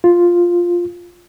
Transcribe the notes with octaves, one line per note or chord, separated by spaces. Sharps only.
F4